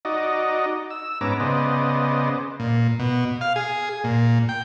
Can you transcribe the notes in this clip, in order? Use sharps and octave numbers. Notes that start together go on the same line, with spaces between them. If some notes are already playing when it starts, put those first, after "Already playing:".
D#4 F#4 D5 D#5
E6
G#2 B3 C#4 A#5 D6
C#3 B3 C5 D5 D#5
A#2
B2
F5
G#4
A#2
G5